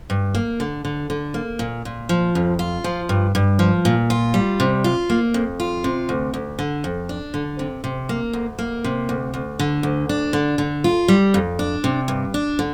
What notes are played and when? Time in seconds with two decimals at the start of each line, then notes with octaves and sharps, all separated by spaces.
0.10 G2
0.35 A#3
0.60 D3
0.85 D3
1.10 D3
1.34 A#3
1.59 A#2
1.85 A#2
2.09 F3
2.35 F2
2.59 F4
2.84 F3
3.09 G2
3.35 G2
3.59 F3
3.85 A#2
4.10 F4
4.34 G3
4.60 C3
4.84 F4
5.10 A#3
5.34 F2
5.60 F4
5.84 C3
6.09 D2
6.34 D2
6.59 D3
6.84 F2
7.09 D4
7.34 D3
7.59 C3
7.84 C3
8.09 A#3
8.33 D2
8.59 A#3
8.84 C3
9.09 D2
9.34 D2
9.59 D3
9.83 D2
10.09 D4
10.33 D3
10.58 D3
10.84 F4
11.08 G3
11.34 F2
11.59 D4
11.84 C3
12.08 G2
12.34 D4
12.59 D3